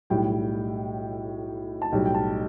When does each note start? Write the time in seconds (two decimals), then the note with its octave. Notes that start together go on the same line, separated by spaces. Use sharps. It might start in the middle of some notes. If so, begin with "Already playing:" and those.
0.10 B1 A2 G3 G5
1.82 A5
1.92 B1 A2 G3 G5
2.05 G5
2.14 A5